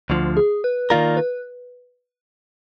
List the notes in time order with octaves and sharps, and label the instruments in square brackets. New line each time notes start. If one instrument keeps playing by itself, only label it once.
[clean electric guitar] D2 D3 F3
[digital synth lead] G#4
B4
[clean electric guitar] D#3 A#3 F4 A#4 [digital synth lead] D5
[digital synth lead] B4